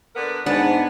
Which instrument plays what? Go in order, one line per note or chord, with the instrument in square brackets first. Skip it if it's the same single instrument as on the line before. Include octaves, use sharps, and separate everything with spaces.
[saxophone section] D3 B3 A#4
[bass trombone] G#2 [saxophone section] B3 [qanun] D4 [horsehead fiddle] F#5 G#5